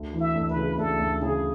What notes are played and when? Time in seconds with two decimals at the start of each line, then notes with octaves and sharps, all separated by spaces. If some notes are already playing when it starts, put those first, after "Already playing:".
Already playing: D2
0.13 E3
0.20 E5
0.35 D2
0.49 B4
0.56 C#3
0.78 D2 A4
0.99 D2
1.21 C#3 G#4